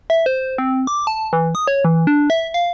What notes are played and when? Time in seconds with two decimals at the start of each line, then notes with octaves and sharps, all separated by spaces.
0.10 E5
0.26 C5
0.58 C4
0.87 D6
1.07 A5
1.33 E3
1.55 D#6
1.68 C#5
1.85 E3
2.07 D4
2.30 E5
2.54 F5